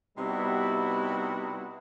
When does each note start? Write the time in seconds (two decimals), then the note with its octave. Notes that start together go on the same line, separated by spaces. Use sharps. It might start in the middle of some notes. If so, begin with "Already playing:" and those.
0.17 C3 G3 B3 D#4 E4 F#4